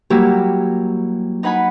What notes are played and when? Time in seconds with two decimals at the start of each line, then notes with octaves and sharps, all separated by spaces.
0.10 F#3 G3 A#3 E4 F#4 G4
1.43 D#4 B4 F#5 G#5 B5